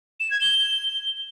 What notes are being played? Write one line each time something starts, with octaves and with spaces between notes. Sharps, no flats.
E7
G#6
G7